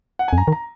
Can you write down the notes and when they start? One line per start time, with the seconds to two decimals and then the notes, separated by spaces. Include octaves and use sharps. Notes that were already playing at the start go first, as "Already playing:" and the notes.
0.19 F#5
0.28 G#5
0.33 F2
0.38 F#2 A#5
0.48 D#3
0.52 A#5